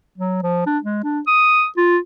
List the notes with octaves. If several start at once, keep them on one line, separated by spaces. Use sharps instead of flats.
F#3
F3
D4
G#3
D4
D#6
F4